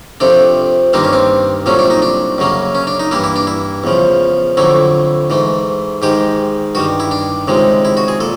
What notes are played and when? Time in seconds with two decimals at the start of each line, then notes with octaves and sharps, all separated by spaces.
0.20 F2 C3 F3 A3 D4
0.93 G2 D#3 G3 A#3 C4
1.04 C#4
1.13 C4
1.66 C2 A#2 F#3 A3 C#4
1.79 D4
1.90 D#4
2.02 D4
2.38 F#2 C#3 F#3 A#3
2.75 C#4
2.87 D4
3.00 D#4
3.11 G2 E3 G3 A#3 E4
3.24 E4
3.36 D4
3.47 E4
3.84 E2 C#3 F3
4.57 F2 D3 F#3 A3 E4
5.30 G#2 E3 A3
6.02 G#2 D#3 G#3 G4
6.75 G2 D#3 G3 F#4
7.00 E4
7.11 D4
7.48 C#2 C3 D#3 G#3
7.85 E4
7.97 F#4
8.08 G#4
8.20 A#2 A4